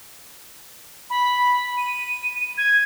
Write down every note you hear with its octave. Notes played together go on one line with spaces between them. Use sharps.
B5
D#7
G#6